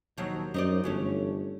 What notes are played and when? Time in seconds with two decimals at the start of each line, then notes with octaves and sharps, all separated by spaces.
0.17 D#2 B2 F3 F#3
0.54 F#2 D#4 C5 D5
0.84 G1 E3 A3 C#4